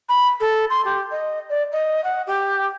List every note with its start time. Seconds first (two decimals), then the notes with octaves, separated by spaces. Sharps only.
0.09 B5
0.40 A4
0.70 C6
0.85 G4
1.11 D#5
1.49 D5
1.72 D#5
2.04 F#5
2.27 G4